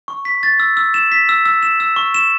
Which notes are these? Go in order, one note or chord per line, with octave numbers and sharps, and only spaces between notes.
C#6
B6
A6
E6
E6
E7
B6
E6
E6
E7
E6
C#6
E7